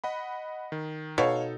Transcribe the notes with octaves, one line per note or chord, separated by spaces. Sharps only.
D#5 F#5 B5
D#3
B2 D#4 A4 C#5 F5